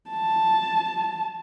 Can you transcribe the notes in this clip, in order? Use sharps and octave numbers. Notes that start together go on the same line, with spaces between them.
A5